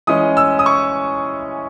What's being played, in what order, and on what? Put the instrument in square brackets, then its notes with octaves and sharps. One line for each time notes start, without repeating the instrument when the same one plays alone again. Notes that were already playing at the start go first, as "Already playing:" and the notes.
[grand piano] E3 G#3 C#4 D#6
E6
D#6
C#6